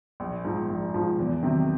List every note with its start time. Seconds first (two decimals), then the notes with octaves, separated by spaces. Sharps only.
0.20 A#1
0.45 G#2 F3
0.69 A#1
0.94 G#2 F3
1.19 E2
1.43 C3 D#3 F#3